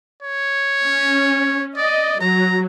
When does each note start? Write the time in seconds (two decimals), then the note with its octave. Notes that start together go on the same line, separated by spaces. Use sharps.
0.23 C#5
0.84 C#4
1.77 D5 D#5
2.21 F#3 A#5